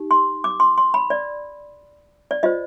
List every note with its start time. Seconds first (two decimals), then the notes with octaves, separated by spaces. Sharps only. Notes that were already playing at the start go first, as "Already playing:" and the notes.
Already playing: D#4 G4
0.11 C6
0.44 D6
0.60 C6
0.78 C6
0.94 B5
1.10 D5
2.31 D5
2.43 F4 C5 D#5